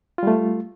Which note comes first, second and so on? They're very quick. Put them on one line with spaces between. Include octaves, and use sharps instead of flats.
F4 G3 A3